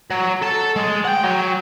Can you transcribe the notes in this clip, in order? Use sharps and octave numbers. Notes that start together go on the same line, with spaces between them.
F#3
A4 A5
G#3
F#5 G5
F#3